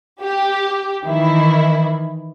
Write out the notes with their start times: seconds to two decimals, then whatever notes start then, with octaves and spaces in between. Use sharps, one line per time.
0.21 G4
1.04 D#3 E3 E4